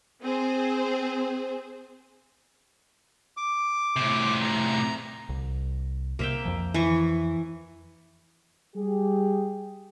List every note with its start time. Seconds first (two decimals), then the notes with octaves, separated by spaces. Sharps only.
0.22 C4 G#4 C5
3.37 D6
3.96 A2 C3
4.42 A#5
5.29 C2
6.19 C2 C3 A#3 E5 G5
6.45 F2 F3
6.74 E3 C#6
8.75 G3 G4 G#4